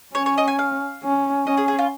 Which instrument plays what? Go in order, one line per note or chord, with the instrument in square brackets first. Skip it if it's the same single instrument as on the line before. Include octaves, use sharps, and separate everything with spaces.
[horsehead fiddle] C#4 [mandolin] C#5
[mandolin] C#5
D#5
G#5
F5
[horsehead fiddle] C#4
[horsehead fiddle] C#4 [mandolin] D#5
[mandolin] G#4
G#4
F4